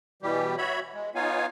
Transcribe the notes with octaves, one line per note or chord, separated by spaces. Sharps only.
B2 E3 G3 G4
F#4 C#5 E5 B5
G#3
B3 D#4 F4 C#5 F5 G#5